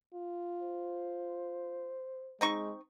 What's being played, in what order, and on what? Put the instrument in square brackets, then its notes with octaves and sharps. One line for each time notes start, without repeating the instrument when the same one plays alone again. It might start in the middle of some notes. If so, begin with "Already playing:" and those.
[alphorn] F4
[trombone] C5
[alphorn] G#3 [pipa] C4 D#4 C#6